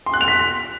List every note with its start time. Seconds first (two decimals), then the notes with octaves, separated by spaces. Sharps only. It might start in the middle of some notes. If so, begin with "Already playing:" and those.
0.06 C6
0.14 F#6
0.21 F7
0.28 B6